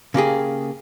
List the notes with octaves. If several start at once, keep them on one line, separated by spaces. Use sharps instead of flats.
C#3 A#3 G4 G#4